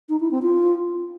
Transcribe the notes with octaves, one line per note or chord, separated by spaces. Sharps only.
D#4
E4
C4
F4